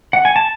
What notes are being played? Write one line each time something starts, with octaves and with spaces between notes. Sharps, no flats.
F#5
G#5
A5